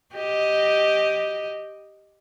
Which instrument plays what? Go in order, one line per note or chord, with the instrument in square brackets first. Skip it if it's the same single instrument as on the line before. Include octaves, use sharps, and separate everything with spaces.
[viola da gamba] G4 D#5